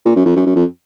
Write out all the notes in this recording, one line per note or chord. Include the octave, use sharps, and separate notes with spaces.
A#2
F#2
F2
F#2
F#2
F2